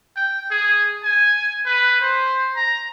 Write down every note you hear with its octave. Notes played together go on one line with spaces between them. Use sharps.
G5
G#4
G#5
B4
C5
A#5